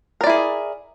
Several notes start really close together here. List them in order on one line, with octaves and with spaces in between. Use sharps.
A#4 D5 E4 G#4